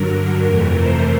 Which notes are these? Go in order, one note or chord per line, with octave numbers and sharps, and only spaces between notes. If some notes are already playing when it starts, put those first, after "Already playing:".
Already playing: G2 D3 F#3 A#4
F2 C3 E3 A3
C5